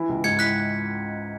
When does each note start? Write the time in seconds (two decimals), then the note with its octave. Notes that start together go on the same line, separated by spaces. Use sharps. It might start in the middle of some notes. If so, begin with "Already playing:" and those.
Already playing: E3 E4
0.09 C#2
0.24 G#2 G#6 C#7
0.39 E4 F#6 B6